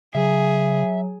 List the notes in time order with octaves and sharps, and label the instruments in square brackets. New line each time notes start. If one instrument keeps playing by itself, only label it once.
[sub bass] C#3 [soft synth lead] F#3 [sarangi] G#4 [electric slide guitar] E5